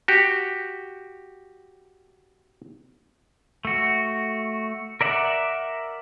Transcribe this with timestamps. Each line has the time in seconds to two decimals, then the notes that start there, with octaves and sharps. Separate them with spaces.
0.08 F#4 G4
3.65 A3 F#4
5.01 A#4 D5 E5 F#5